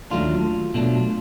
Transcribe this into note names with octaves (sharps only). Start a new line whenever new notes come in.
D#2 D#3 F#3 A3 D4 F4
B2 F#3 A3 D4